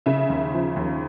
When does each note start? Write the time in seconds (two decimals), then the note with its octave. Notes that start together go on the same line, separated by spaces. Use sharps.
0.06 C#3 E5
0.29 D#2
0.53 F3
0.76 D#2